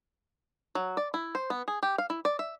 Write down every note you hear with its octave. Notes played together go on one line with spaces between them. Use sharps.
F#3
D5
E4
C5
B3
G#4
G4
F5
E4
D5
E5